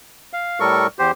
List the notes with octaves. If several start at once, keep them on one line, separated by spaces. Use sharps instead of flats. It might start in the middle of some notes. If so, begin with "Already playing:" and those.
F5
A2 G3 A4 A#4 C#6
E2 G4 C5